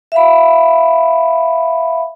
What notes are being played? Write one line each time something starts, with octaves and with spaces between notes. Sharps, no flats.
E5 F5 B5